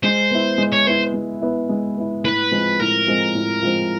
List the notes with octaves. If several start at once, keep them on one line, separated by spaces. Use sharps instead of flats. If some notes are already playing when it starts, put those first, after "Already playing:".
G#3 C5
B3 E4
G#3
C#5
B3 E4 C5
G#3
B3 E4
G#3
B3 E4
A2 B4
F3 G#3 C4
A2 A#4
F3 G#3 C4
A2
F3 G#3 C4